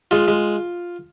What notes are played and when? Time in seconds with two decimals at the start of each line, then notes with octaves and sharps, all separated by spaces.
0.11 G#3 F4
0.28 G#3